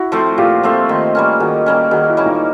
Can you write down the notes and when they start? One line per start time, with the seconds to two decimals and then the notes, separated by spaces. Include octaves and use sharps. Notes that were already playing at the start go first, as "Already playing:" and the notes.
Already playing: E4 F#4
0.12 F3 A3 C4
0.38 A#2 F4 G4
0.63 F3 A3 C4
0.89 D#3
1.15 G3 A#3 C#4
1.40 D#3 F#4 G#4
1.66 G3 A#3 C#4
1.91 D#3 F#4 G#4
2.09 E4 F#4
2.17 G3 A#3 C#4
2.26 D#4 F4